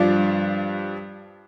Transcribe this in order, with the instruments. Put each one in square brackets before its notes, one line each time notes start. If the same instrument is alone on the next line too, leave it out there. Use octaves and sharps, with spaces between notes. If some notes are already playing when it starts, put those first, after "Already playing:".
Already playing: [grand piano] G2 F3 D4 F4